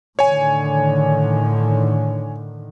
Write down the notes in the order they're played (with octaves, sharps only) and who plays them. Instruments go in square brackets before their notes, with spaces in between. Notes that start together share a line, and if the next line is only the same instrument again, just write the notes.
[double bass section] A2 D3 D#3 [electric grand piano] C#5 G#5